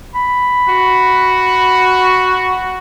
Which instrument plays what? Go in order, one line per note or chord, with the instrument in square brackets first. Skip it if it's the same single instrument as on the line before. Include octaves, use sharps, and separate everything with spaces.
[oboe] B5
[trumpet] F#4